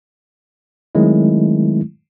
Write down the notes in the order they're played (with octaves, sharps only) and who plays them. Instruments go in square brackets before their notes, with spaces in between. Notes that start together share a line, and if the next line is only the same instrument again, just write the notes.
[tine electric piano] D#3 F#3 G#3 A3 C4 E4